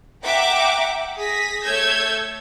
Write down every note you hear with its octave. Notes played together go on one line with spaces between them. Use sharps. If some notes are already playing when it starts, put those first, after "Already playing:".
E5 F#5 G5 A#5 D6
G#4 D#6 A#6 B6
A3 C#5 A5 E6 G6 G#6